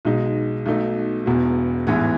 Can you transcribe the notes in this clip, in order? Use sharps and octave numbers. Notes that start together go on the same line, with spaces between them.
B1 B2 G#3 D#4
B1 B2 A3 D#4
E1 E2 B2
A1 G#2 E3 B3